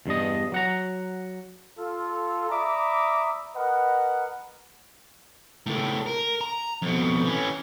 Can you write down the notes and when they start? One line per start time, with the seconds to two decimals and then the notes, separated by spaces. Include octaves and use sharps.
0.06 E2 G2 D4 D#5
0.52 F#3 F#5 A#5
1.78 F4 A4
2.50 D5 E5 A#5 B5 D6 D#6
3.56 A#4 B4 D#5 F#5
5.66 C#2 A2
6.06 A#4
6.41 A#5
6.82 F2 B2
7.24 E3 C#4